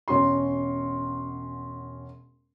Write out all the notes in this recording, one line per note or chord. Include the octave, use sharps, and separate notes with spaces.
E1 C#4 F#4 C6